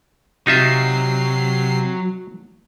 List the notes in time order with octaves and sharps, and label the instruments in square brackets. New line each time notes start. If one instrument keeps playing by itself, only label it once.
[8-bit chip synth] C3 C7 [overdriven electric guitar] F#3 [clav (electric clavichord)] D#4 F4 E5